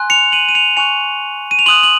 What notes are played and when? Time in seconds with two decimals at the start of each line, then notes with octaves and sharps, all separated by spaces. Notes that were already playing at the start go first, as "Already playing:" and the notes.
Already playing: G#5 C6 F#6
0.10 C#7 F7
0.32 D#7 F#7
0.49 D#7
0.55 C#7 F7
0.77 G#5 C#6 F#6 C#7 F7
1.51 D#7
1.59 F7
1.66 C6 D#6 F#6 D#7 F#7
1.83 F#7